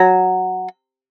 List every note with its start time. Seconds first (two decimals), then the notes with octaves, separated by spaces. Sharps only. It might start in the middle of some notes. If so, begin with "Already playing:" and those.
Already playing: F#3